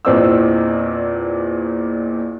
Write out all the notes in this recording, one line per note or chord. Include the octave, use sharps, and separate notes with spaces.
E2 A#2 C4 D4 D#5 E6